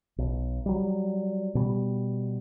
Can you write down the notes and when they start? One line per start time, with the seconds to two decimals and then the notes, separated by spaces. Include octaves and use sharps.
0.18 B1
0.66 F#3 G3
1.55 B2 G3